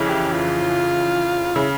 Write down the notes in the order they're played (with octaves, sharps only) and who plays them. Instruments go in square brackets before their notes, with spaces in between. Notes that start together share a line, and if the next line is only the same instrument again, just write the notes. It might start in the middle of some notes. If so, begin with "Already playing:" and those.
Already playing: [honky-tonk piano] F2 C#3 E3
[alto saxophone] G4
F4
[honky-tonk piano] C#3 [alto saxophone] E4